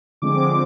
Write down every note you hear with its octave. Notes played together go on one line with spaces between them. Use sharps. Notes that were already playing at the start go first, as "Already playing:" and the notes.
D3 F3 G#3 C4 D6